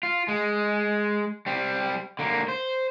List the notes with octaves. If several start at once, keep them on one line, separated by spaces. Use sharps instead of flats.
F4
G#3
G3 C4
D3 A#3
C5